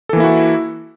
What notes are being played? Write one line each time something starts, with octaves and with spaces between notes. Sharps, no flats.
E3 A#3 E4 F#4 A4